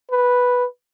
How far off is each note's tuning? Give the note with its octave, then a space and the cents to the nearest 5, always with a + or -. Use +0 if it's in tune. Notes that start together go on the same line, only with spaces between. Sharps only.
B4 -5